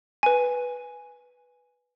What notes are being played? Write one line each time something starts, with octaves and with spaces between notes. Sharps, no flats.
B4 G#5